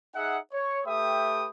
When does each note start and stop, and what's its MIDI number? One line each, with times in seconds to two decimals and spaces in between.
0.15 0.38 63
0.15 0.38 68
0.15 0.38 76
0.15 0.38 78
0.52 0.80 73
0.86 1.49 57
0.86 1.49 67
0.86 1.49 71
0.86 1.49 76
0.86 1.49 79
0.86 1.49 87